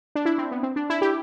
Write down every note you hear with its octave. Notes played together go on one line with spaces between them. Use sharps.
D4
E4
C4
B3
C4
D4
E4
G4